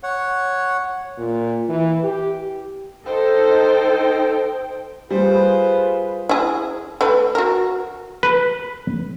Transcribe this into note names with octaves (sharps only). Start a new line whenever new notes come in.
C#5 F#5
A#2
E3
G4
D#4 A4 C5 G5
G3 F4 G#4 B4 C5
E4 G#4
A3 B4
F#4 A#4
B4